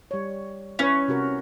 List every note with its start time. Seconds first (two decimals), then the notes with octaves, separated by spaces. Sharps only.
0.11 G3 C#5
0.79 C#4 E4 B4 C#5
1.08 C3 F#4 A#4